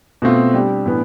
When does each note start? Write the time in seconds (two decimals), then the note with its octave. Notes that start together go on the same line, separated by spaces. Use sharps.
0.22 B2 A3 C4 F4
0.54 G3 D4 G4
0.86 A2 E3 B3 D4